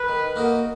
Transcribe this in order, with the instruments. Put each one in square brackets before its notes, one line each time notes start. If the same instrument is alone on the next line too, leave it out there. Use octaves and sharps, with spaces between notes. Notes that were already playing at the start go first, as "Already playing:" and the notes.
Already playing: [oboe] B4
[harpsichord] D#3
A#3 D#4 F#4 A#4